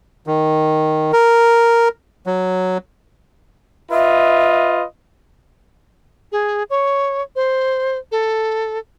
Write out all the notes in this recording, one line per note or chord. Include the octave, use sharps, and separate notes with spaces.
D#3
A#4
F#3
F4 B4 D#5 E5
G#4
C#5
C5
A4